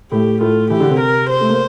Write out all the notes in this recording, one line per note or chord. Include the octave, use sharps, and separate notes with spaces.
A2 A3 G4
A2 A3 F4
E3 E4 G4
D3 D4
C3 C4
A#4
C5
A3
A#3